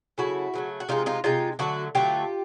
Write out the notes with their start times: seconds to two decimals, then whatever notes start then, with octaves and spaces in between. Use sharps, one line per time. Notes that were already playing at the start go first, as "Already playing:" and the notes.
0.18 C#3 F#3 A3 E4 F#4
0.54 C#3 F#3 A3
0.80 F#4
0.89 C3 F3 G#3 D#4 F4
1.06 D#4 F4
1.24 C3 F3 G#3 D#4 F4
1.59 D3 F#3 A3 E4 F#4
1.95 D3 F#3 A3 F4 G4